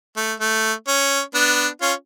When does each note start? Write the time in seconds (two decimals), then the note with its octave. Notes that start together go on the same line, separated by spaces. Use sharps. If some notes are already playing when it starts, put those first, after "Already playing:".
0.17 A3
0.40 A3
0.88 C#4
1.34 B3 D4
1.81 C#4 F4